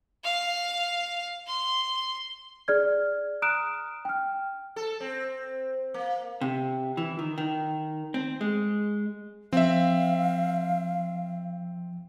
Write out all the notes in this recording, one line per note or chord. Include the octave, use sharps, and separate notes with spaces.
F5
C6
G#4 D5 F6 G#6
A#5 D#6 F6 F#6 D7 E7
G5 F6
A4
C4
A#3
C3
E3
D#3
D#3
C4
G#3
F3 C4 E5 F5